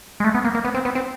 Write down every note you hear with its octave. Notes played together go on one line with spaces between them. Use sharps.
G#3
A3
B3
A#3
A#3
B3
C4
B3
C4